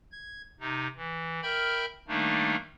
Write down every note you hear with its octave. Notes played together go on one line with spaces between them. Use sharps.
G#6
C3 D#4
E3
A#4 E5 G5 B5 F6 G6
D#3 G3 A3 A#3 D4 D#4